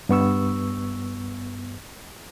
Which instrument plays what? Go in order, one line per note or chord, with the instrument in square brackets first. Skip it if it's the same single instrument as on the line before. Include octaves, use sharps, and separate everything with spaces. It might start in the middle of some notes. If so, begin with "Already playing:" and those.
[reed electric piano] G2 B3 C#6 E6